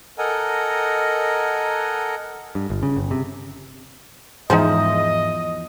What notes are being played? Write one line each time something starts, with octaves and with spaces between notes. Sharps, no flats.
A4 A#4 D#5 F#5 G#5 A#5
G2
G1
C#3
G1
C3
E2 G#2 F3 D#4 G#4 C5 D#5